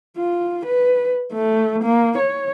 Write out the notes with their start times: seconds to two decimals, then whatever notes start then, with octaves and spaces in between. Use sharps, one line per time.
0.17 F4
0.65 B4
1.33 A3
1.83 A#3
2.18 C#5